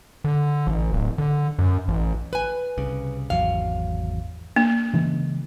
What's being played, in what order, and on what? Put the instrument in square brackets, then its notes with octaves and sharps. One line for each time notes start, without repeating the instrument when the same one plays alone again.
[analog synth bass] D3
A1
D1
D3
F#2
A1
[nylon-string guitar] B4 G#5
[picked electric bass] C2 C#3
[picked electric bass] G#1 E2 F#3 [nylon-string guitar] F5
[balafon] A#3 [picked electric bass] D4
[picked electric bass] C#3 E3 G#3